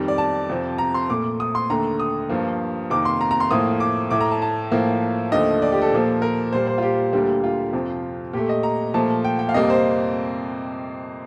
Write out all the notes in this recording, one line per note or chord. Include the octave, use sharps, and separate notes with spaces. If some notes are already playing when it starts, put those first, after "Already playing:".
Already playing: F2 D#3 G3
D5
A5
F2 C3 F3
A#5
C6
A#2 A3 D6
D#6
C6
D#2 D3 A3 A#5
D#6
G2 F3 A#3
F2 C3 D#3 A#3 D6
C6
A#5
A#5
C6
A2 F3 A#3 D#6
D6
A2 A3 D6
A#5
A5
A5
A2 F3 A#3
D#2 D3 F3 A3 D#5
D5
G4
A4
A#2 F3 A#3
A#4
A#2 G3 A#3 C5
C5
F4
G4
D2 D3 G3 A#3 G4
F4
F2 C3 F3
A#2 A3 G4
D#5
A#5
A#2 F3 A3 A5
G5
G5
F5
F2 C3 G3 A#3 D#5
C5